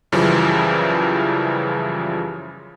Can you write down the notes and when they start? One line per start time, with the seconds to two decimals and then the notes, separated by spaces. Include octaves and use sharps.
0.12 F#2 C#3 E3 F3 G3